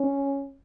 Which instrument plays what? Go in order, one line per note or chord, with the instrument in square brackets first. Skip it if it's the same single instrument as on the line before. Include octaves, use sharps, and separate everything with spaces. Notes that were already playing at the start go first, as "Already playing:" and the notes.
Already playing: [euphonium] C#4